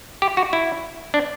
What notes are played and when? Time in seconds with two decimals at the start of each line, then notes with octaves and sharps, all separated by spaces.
0.22 G4
0.37 F#4
0.53 E4
1.14 D4